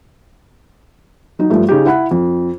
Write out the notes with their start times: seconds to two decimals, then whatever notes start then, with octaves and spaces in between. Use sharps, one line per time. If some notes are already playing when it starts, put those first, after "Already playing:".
1.39 F#3 D#4
1.50 G2 F3 A3
1.69 C#3 D#4 G4
1.86 E4 F#5 B5
2.11 F2